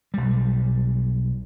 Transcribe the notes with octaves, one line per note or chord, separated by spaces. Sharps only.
B1 G3